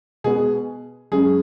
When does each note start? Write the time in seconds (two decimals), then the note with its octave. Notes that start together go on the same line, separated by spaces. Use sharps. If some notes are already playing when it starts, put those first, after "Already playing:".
0.24 B2 G#3 B3 G#4
1.12 F#2 C#3 G#3 G#4